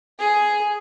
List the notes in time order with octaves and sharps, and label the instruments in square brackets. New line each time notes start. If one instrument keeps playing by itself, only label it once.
[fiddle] G#4